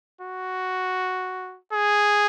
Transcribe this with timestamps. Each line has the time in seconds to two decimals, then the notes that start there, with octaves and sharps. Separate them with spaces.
0.21 F#4
1.73 G#4